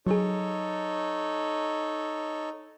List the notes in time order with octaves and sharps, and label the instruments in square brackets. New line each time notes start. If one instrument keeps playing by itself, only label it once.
[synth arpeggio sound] F#3 G#4 [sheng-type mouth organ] D#4 A4 C#5